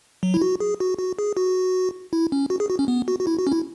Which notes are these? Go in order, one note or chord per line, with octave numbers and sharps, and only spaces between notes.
F#3
E4
F#4
G#4
F#4
F#4
G#4
F#4
E4
C#4
F#4
G#4
F#4
C#4
B3
F#4
F#4
E4
F#4
C#4
E4